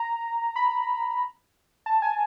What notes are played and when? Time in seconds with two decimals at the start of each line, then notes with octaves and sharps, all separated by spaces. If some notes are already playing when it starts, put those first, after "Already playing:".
Already playing: A#5
0.56 B5
1.86 A5
2.02 G#5